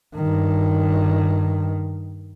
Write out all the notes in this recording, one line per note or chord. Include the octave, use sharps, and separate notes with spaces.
G2 D#3